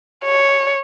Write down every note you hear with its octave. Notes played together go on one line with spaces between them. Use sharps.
C#5